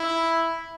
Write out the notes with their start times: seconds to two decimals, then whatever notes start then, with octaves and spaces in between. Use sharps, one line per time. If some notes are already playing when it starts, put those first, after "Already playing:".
Already playing: E4